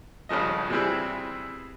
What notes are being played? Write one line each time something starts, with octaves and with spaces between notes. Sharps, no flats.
G#1 G2 C#3 F3 D#5
C3 E3 G3 C4 E4 G#4